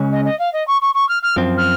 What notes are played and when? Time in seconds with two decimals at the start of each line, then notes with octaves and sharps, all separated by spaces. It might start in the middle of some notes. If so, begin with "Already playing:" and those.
Already playing: C#3 G#3 C#4
0.12 D#5
0.25 D#5
0.39 F5
0.53 D#5
0.67 C#6
0.81 C#6
0.94 C#6
1.08 F6
1.22 F6
1.36 F#2 F3 C4
1.57 F6